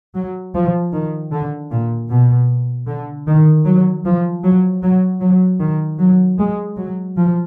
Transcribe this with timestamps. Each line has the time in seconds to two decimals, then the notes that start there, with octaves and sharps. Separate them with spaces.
0.15 F#3
0.54 F3
0.93 D#3
1.32 D3
1.71 A#2
2.10 B2
2.87 D3
3.27 D#3
3.66 F#3
4.04 F3
4.43 F#3
4.82 F#3
5.21 F#3
5.60 D#3
5.99 F#3
6.38 G#3
6.76 F#3
7.16 F3